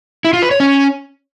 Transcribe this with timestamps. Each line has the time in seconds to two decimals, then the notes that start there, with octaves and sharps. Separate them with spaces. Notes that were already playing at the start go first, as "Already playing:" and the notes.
0.25 E4
0.33 F4
0.42 B4
0.51 C#5
0.60 C#4